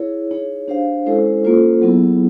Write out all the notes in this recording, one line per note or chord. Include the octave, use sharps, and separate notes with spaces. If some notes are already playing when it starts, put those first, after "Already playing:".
Already playing: E4 G#4 C#5
D#4 G#4 C#5
D4 G4 C5 F5
G#3 C#4 E4 A4 C5
A#3 C#4 F4 A4 C5
F#3 B3 E4 G#4